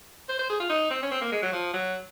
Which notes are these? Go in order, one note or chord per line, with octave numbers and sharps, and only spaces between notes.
C5
C5
G#4
F4
D#4
C4
C#4
C4
A#3
G#3
F#3
F3
F#3